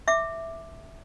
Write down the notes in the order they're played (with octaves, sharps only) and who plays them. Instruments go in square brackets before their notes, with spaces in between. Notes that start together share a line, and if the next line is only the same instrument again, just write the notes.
[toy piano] E5 D6